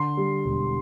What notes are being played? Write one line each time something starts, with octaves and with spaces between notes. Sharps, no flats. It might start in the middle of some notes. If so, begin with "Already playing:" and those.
Already playing: D3 C6
G3
E1